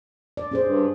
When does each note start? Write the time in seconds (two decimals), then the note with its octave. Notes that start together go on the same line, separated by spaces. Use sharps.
0.37 D5
0.51 C#4 G#4 C5
0.64 G2